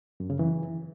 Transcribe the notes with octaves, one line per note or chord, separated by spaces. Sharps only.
F#2
C#3
E3